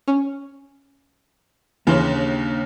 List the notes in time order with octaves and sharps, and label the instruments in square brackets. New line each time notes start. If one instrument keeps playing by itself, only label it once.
[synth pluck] C#4
[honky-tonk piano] D#2 C#3 [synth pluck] E3 [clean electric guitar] A#3 D4 C6